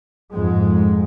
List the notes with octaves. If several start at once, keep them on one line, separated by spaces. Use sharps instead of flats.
F2 G#2 G#3